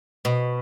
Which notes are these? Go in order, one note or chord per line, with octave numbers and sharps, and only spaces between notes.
B2